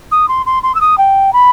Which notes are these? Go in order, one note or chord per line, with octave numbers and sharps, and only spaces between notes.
D#6
C6
C6
C6
E6
D#6
G5
B5